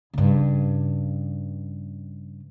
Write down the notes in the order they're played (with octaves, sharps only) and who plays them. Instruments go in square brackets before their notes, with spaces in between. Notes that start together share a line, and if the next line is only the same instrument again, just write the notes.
[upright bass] G2 C#3